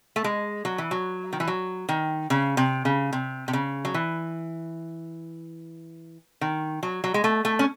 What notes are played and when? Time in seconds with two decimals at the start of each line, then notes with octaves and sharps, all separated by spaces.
0.16 A3
0.24 G#3
0.65 F#3
0.78 E3
0.91 F#3
1.33 D#3
1.40 E3
1.47 F#3
1.89 D#3
2.30 C#3
2.57 C3
2.85 C#3
3.13 C3
3.48 C3
3.53 C#3
3.85 F#3
3.94 E3
6.41 D#3
6.83 F#3
7.04 F#3
7.14 G#3
7.24 A3
7.45 A3
7.59 C#4